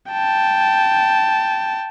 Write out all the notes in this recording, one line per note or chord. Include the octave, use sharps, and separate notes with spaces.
G5 A5